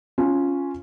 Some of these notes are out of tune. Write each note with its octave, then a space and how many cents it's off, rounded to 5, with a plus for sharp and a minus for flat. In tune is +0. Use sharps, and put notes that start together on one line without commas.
C#4 +0 F4 +0